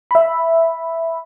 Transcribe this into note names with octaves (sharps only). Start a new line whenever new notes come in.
E5 B5